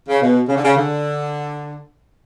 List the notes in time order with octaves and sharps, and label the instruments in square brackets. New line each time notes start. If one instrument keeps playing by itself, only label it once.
[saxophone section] C#3
B2
C#3
D3
C#3
D3